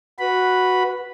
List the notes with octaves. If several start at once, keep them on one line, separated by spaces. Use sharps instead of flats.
F#4 B4 B5